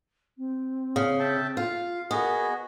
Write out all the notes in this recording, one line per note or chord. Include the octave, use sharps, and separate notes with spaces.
C4
C#3
E5 G5 A5
F4 F5
B3 F#4 G#4 A#4 D#5